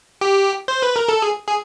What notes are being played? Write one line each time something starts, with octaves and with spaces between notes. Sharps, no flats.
G4
C5
B4
A#4
A4
G#4
G#4